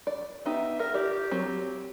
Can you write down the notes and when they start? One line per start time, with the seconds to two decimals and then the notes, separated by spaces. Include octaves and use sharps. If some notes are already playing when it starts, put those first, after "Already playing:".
0.07 D5
0.45 B3 D#4 G4 E5
0.79 A#4 E5
0.94 G4 D5
1.31 F#3 C4